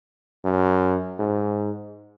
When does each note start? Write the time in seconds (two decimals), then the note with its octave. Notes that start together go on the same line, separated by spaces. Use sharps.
0.45 F#2
1.19 G#2